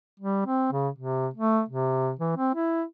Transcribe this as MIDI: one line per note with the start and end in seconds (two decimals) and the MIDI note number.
0.20 0.45 55
0.47 0.70 60
0.72 0.89 49
0.98 1.28 48
1.34 1.62 57
1.69 2.12 48
2.19 2.33 52
2.37 2.53 60
2.55 2.84 64